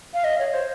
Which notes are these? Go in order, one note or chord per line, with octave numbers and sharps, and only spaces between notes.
F5
D#5
C#5
C5